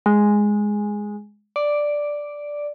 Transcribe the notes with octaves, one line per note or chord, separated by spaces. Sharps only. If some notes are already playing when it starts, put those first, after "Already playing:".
G#3
D5